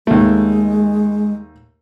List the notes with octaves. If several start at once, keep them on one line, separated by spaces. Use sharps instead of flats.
D#2 G#3 A3